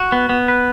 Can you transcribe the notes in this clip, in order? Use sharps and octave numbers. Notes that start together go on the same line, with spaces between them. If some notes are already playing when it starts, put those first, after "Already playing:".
Already playing: F#4
B3
B3
B4